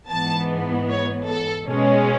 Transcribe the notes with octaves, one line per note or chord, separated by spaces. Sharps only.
G#2 E3 B3 A5
C#5
A4
B2 G#3 C#4